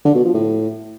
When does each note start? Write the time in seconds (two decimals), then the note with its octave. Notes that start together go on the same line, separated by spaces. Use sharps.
0.05 D3
0.15 B2
0.24 F3
0.34 A2